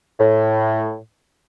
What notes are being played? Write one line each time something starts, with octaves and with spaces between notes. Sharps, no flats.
A2